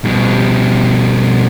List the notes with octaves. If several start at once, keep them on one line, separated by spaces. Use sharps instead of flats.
B2 G3